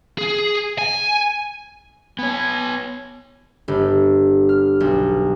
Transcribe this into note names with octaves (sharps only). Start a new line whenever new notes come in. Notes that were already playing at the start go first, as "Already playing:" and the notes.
G#4
G#5
B3 C#5 G#5
G1
F6
B1